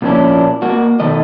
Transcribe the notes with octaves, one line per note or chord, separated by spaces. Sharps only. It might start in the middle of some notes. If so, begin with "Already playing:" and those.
A#2 F3 A#3 C#4 D4 E4
A#3 F#4
B2 D#3 A3 D#5